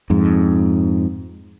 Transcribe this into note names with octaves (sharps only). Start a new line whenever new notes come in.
F2 G#2